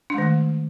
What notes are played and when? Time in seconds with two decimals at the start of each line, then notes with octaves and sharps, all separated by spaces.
0.10 D4
0.14 G#3
0.18 D#3
0.22 A3